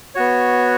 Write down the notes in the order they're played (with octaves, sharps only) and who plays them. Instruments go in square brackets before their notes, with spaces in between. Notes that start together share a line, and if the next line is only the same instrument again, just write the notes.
[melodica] B3 F#4 C#5